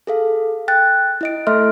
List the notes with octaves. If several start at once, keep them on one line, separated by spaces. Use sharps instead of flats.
G#4 A4 F5
G5 F#6 A6
E4 D#5 D7
A3 A4 D#5 E5 C6 F6